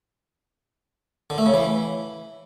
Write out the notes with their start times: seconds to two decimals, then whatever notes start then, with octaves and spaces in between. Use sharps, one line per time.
1.30 D3
1.38 A3
1.46 C#3
1.54 E3